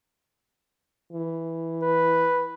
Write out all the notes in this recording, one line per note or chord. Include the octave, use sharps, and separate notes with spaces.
E3
B4